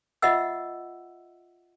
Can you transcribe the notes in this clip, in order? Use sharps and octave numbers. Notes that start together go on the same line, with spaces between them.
F4 D#5 E5 F#5 E6